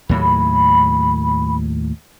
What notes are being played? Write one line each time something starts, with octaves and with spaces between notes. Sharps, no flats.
D#2 A2 F#3 B5